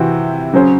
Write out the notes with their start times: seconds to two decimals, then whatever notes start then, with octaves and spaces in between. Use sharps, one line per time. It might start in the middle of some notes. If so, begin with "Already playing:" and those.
Already playing: C3 E3 C4 F#4
0.53 C#3 F#3 C#4 G#4 C5